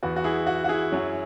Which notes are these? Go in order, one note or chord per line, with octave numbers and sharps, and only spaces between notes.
E2 E3 B3 F#4
F#4
E4 G#4
F#4
F#4
E4 G#4
F#2 F#3 C#4